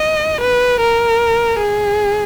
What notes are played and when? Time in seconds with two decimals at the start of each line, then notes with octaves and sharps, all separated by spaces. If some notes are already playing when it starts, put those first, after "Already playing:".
Already playing: D#5
0.41 B4
0.80 A#4
1.59 G#4